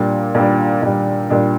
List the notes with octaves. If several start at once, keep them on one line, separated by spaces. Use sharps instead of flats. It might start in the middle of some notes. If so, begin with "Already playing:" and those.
Already playing: A#2 G3 D4
A#2 G3 D4
A#2 G3 D4
A#2 G3 D4